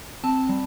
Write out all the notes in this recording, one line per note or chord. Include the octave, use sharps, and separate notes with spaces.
C4 A5
G3